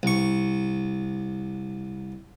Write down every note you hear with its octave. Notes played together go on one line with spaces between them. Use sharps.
C2 C#6